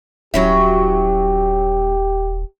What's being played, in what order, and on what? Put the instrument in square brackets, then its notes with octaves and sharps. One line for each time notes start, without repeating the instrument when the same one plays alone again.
[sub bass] D#1 [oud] F#3 C#4 E4 [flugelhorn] G4